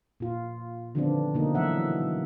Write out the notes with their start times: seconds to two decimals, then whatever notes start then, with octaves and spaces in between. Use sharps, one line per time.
0.20 A#2 F4
0.95 D3 D#3 F3 B3 C4 D4
1.34 B2 D3 A#3 D#4
1.55 E3 F#3 E5 F#5